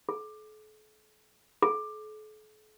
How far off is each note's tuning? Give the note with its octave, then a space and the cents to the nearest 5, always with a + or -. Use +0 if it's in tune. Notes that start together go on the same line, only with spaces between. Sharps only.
A4 -45
A4 -45